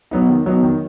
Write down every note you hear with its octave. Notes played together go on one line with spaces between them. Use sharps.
F#3 B3 D#4
D#3
F#3 B3 D#4
D#3